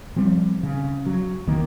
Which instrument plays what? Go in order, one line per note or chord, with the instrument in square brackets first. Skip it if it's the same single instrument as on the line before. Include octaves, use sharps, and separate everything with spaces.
[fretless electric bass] F3 G3 C4
C#3
F#3
C2 D#3 A#3